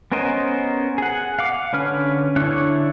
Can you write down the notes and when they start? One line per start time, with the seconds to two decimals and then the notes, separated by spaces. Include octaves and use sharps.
0.12 B3 C#4 A#4 C5 D#5
0.98 G#4 F#5
1.39 F5 F#5 D6
1.73 D3 C#4 B4 F6
2.36 D3 D4 E4 C#5 F#6